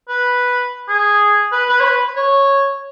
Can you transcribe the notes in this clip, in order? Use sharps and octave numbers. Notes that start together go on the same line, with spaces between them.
B4
G#4
B4
B4
C#5
B4
C#5